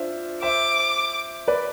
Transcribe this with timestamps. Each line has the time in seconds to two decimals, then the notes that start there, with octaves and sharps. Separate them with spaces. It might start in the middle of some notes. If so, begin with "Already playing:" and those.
Already playing: D4 F4 C5 E5
0.42 C5 E5 D6
1.48 B4 D5